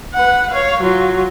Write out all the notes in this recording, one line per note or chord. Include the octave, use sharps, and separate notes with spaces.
B4 F#5
C#5 F5
F#3 F4